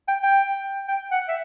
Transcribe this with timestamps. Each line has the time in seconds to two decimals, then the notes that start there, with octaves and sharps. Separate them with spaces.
0.08 G5
0.23 G5
0.88 G5
1.12 F#5
1.28 E5